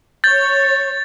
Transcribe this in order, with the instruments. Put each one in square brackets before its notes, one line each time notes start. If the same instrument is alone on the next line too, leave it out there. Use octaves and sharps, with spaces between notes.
[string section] C#5 [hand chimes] G6 [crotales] A6